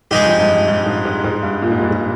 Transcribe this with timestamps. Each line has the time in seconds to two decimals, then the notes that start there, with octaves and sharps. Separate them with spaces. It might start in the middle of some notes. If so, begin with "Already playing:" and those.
0.11 G#2 G#3 D#4 G4
0.20 G2
0.25 F2
0.40 G2
0.53 F2
0.68 G2
0.86 G#2
1.05 G#2
1.24 G#2
1.43 G2
1.62 A#2
1.72 G#2
1.82 G2
1.91 G#2